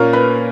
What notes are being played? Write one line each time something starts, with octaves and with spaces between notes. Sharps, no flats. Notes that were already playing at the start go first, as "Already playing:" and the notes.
Already playing: A#2 A#3 C#4 A#4
B4